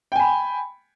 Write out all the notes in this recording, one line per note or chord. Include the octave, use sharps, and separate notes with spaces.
G5 G#5 B5